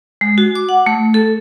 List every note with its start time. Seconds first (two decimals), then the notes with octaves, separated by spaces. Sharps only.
0.21 G#3
0.38 F#4
0.55 D6
0.69 F#5
0.86 A3
1.14 A4